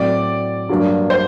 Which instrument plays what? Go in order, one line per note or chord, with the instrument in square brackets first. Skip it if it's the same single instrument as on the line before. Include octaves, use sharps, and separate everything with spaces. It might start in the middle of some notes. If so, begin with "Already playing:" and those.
Already playing: [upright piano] A2 F#3 C4 [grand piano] D5
[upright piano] G2 F#3 A#3 D4
[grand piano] C5